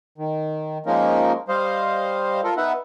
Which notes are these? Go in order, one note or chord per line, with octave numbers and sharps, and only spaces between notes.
D#3
F3 G#3 A#3 C#4 D#4 A#4
G3 C5 D#5 F5
F4 A4 A#4
B3 D#4 B4 E5 F#5